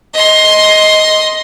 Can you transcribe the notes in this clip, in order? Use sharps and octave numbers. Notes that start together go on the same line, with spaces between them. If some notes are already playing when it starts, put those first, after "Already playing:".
D#5 C6